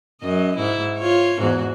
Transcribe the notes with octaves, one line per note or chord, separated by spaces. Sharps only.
F#2 D#5
G#2 E4
F4 C#5
E2 G#2 F#4